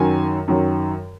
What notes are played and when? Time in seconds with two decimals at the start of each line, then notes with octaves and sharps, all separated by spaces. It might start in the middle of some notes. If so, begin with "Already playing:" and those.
Already playing: F#2 D#3 F#3 G#5
0.48 F#2 D#3 F#3